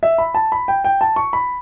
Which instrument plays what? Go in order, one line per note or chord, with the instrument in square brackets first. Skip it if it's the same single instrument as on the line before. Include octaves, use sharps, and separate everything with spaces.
[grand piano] E5
B5
A5
B5
G5
G5
A5
C#6
B5